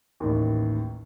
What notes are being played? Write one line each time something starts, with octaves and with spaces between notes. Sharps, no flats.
A1 D#2